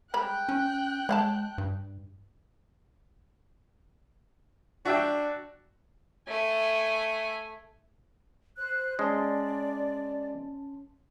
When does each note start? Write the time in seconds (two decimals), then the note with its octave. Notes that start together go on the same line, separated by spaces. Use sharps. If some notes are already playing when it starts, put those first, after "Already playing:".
0.14 G3 G#3 G5 B5 F#6
0.49 C#4
1.09 G#3 C#5 F#5 A5
1.58 G2
4.85 D4 F#4 E5 G5
6.28 A3 G#5
8.58 C5 F#6
8.99 G#3 C#4 D5 A5 C6